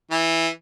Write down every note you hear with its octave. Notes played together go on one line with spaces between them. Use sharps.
E3